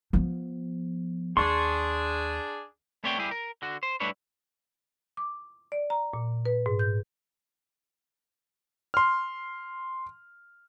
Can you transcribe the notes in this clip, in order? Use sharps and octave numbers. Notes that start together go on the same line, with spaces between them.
F3 B3
D#2 D4 G#4 C6 C#6
A3 B3 C4 C#5 D5 G5
G3 E4 G4 G#4
A#4
D3 F#4
C5
G3 A3 D4 E4 B4 C#5
D6
D5
A#5
A#2
B4
G#2
G6
C6 F6